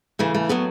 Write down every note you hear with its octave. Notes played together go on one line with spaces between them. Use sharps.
C#3 E3 A3
A3
A2 F#3 B3